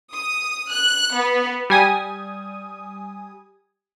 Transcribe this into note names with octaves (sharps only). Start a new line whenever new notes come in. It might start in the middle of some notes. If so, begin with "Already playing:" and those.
D#6
F#6
B3
G3 G#5 D#6